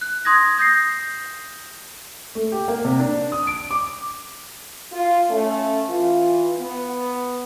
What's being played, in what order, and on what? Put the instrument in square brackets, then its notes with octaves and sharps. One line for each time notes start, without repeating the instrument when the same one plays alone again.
[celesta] F#6
C6 D#6 G#6 A#6
D#6 G6 A#6 C7
[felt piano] A3
G4
A#3
C3
D4
D#6
D7
D6
[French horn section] F4
A3 C#4
E3 F4
B3